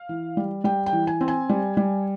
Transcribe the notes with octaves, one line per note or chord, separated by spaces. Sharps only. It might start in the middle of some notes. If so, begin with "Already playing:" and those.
Already playing: F5
E3
G3
G3 G5
G5
E3
G#5
C4
G#5
G3
G3